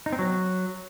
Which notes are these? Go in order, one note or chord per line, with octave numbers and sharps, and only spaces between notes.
D#4
C4
F#3